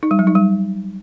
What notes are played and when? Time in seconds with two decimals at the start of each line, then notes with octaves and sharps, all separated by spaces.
0.03 D#4
0.11 G3
0.19 F#3
0.27 D#4
0.35 G3